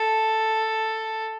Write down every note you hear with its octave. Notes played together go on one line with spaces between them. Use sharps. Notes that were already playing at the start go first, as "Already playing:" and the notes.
Already playing: A4